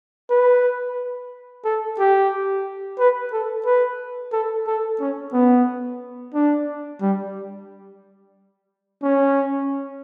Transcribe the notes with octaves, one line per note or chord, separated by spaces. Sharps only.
B4
A4
G4
B4
A4
B4
A4
A4
C#4
B3
D4
G3
C#4